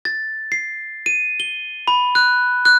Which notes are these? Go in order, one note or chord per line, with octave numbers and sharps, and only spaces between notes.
A6
C7
D#7
G7
B5
F#6
F#6